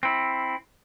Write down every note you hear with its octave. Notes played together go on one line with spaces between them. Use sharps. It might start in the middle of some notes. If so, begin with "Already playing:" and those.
C4 E4